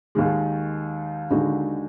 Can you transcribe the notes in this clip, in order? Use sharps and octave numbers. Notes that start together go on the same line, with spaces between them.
D#2 D#3 G#3
D#2 D3 G#3 D#4 F#4